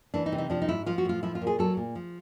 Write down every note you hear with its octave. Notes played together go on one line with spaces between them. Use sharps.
E3 D4
D#4
C3
D#4
F3 D4
D#4
G#2 E4
F3 F4
F#4
A2 F4
F3 E4
F4
A#2
G#4
F#3 A4
A#2
F3